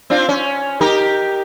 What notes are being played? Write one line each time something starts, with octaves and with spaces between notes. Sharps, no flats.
C4 D4 F4
C#4
D#4 G4 A#4